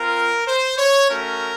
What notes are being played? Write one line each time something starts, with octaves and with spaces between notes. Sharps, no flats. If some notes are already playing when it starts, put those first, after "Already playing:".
Already playing: C4 F4 A#4
C5
C#5
A3 C#4 F#4 A#4